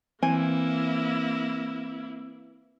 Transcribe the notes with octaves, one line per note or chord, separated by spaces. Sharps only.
E3 A#3 C4 E4 G#5